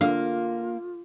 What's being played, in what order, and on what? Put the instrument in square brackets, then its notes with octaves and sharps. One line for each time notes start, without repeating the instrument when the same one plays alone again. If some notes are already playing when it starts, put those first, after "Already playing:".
[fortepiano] D3 [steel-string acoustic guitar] A#3 [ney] F4 [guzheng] F5